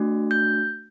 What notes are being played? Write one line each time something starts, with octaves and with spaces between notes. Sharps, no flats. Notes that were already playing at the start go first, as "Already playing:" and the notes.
Already playing: A3 D4 F#4
G6